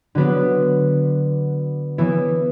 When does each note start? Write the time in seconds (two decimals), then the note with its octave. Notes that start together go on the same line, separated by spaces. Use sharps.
0.15 D3 F#3 B3 D4 F#4
1.98 E3 B3 E4